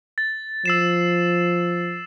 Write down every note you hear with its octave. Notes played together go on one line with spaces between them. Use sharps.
A6
F3 E6 C7 E7